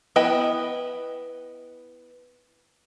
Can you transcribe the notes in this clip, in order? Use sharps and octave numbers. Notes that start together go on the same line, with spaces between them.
B3 E4 B4 D#5 G5